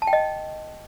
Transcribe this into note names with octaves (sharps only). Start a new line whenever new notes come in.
A5
G5
D#5